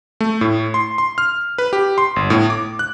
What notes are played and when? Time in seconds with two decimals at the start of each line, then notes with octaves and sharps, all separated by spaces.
0.20 A3
0.41 A2
0.74 C6
0.98 C6
1.18 F6
1.58 B4
1.73 G4
1.98 C6
2.16 G1
2.30 A2
2.50 D6
2.79 F#6